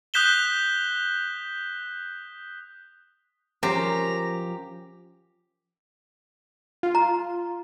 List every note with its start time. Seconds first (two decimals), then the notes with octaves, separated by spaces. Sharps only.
0.14 D#6 F#6 G6 B6 E7 G7
3.63 F3 C#4 G4 A#4 C5 A#5
6.83 F4
6.95 A#5